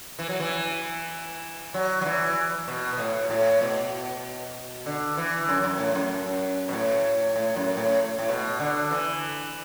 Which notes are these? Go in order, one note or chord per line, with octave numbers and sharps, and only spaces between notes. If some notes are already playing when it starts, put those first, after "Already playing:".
E3
F#3
E3
F#3
F#3
E3
B2
B2
A2
A2
B2
D3
E3
F#2
F#2
A2
F#2
B2
A2
A2
F#2
A2
A2
B2
D3
E3